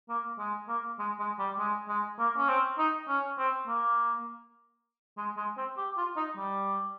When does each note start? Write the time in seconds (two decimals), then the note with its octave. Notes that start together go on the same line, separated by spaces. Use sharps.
0.10 A#3
0.39 G#3
0.68 A#3
0.99 G#3
1.19 G#3
1.39 G3
1.59 G#3
1.88 G#3
2.19 A#3
2.37 C#4
2.48 C4
2.78 D#4
3.09 C#4
3.39 C4
3.68 A#3
5.18 G#3
5.37 G#3
5.58 C4
5.77 G4
5.98 F4
6.17 D#4
6.37 G3